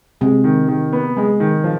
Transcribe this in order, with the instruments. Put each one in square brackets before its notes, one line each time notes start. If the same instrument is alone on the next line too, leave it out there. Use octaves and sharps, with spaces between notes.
[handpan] C3 [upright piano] G#3
[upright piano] D#3
D#3
B3
G#3
D#3
F3